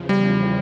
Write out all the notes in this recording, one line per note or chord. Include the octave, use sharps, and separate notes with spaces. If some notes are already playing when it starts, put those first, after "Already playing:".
Already playing: E2 C#3 F3
G3